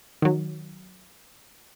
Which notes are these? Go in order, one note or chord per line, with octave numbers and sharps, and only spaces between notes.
D#3 F#3